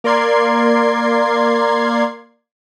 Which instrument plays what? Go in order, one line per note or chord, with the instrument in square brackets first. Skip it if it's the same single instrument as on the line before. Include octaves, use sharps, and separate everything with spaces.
[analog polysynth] A#3 A#4 D5 C6 G#6 C7